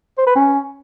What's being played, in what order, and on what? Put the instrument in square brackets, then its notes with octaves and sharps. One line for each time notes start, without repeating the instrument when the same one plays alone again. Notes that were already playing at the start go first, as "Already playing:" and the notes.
[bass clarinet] C5
B4
C#4